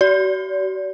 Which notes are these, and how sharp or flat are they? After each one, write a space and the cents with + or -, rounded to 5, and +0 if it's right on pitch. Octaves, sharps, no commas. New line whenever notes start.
F#4 +45 D5 -35